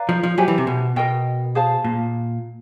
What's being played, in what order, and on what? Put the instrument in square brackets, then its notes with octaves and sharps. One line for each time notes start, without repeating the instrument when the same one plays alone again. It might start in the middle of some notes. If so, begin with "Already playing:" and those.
Already playing: [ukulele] B4 D5 F5 A#5
[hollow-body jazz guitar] F3
F3
[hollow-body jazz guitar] F#3 [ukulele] G4 C5 E5 G#5
[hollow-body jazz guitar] E3
C3
B2
[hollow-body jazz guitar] B2 [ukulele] A#4 D#5 G5
[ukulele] G#4 C5 F5 A5
[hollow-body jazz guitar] A#2